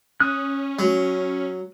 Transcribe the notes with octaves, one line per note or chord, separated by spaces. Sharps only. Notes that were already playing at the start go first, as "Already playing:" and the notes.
C#4 D#6 F#6
F#3